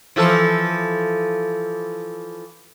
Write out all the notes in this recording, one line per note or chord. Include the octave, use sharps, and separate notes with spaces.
E3 F3 A4